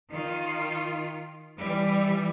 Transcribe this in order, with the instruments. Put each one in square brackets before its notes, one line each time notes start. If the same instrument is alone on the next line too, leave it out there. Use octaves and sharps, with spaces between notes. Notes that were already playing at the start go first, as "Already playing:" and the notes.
[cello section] D#3 F4
E3 G3